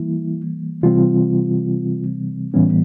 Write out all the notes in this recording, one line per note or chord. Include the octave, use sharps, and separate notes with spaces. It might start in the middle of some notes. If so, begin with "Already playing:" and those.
Already playing: E3 G3 A#3 E4
C3 E3 G3 C4 F4
A2 E3 G3 B3 C#4